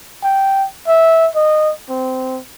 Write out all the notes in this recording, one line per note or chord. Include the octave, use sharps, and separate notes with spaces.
G5
E5
D#5
C4